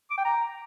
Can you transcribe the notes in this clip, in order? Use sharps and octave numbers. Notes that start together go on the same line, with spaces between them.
D6
G5
A#5